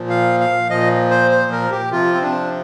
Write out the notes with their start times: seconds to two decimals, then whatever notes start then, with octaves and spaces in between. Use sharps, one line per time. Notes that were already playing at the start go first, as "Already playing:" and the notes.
Already playing: A#2 F3
0.10 F5
0.40 F5
0.70 A#2 F3 D#5
1.11 C5
1.31 C5
1.52 A#4
1.71 G4
1.92 C3 F3 F4
2.14 C4
2.22 D4